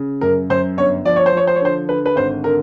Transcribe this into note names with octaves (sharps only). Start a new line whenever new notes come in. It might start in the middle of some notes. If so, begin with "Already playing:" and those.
Already playing: C#3
F#2 A#4
F#2 C5
G1 C#5
F3 D5
C#5
C5
F3 C#5
C5
C#5
D3 C5
D3 B4
B4
G#1 C5
D3 A#4